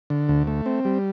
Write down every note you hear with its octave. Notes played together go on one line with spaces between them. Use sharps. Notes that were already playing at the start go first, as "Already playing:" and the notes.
D3
D2
A3
C4
G3